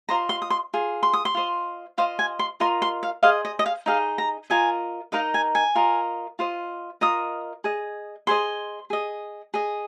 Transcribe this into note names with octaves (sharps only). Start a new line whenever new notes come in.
F4 C5 D#5 A#5
C6
D#6
C6
F4 G#4
C6
D#6
C6
F4 C5 D#5
F4 C5 D#5 F5
G#5
C6
F4 A#4 D#5 C6
C6
F5
G#4 C5 D#5 F5
D#5
D#5
F5
D#4 G#4 D#5 F5
A#5
F4 A#4 D#5 G#5
D#4 A#4 D#5 F5
G#5
G#5
F4 A#4 D#5
F4 C5 D#5
F4 A#4 D#5 D#6
G#4 D#5
G#4 C5 D#5 C6
G#4 D#5
G#4 D#5